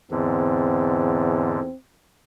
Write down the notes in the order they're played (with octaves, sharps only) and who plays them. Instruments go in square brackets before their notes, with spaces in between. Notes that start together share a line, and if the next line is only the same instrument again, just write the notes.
[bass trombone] E2 [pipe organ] G#2 D3 [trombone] C4